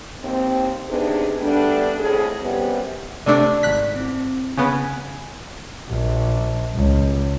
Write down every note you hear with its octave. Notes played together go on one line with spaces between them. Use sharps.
D#2 C4
C3 B3 D4 D#4 G#4
G3 A3 B3 D4
F2 A2 G#4
F#2 C3 G3 B3
C3 A3 D4 D5 A5
G#1 F#6 B6
C4 E4
C#3 B3 G#5
A#1
C#2